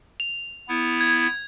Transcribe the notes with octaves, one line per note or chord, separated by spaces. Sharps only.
F7
B3 E4
G#6